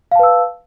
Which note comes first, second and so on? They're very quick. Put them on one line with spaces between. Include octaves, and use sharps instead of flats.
F5 A5 B4 E6